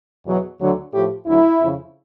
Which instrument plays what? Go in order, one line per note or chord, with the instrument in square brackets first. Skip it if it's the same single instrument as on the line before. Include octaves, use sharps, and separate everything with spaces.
[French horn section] E2 B2 F#3
D2 D3 F#3
A2 F3 G4
D2 D3 F#3 E4
F2 C#3 F3